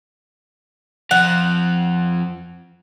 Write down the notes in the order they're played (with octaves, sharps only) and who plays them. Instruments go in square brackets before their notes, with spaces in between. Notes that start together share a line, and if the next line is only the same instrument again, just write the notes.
[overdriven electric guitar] F2 F3 [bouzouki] F#5